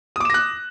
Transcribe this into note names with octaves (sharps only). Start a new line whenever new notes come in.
D6 D#6 F#6 A#6 E7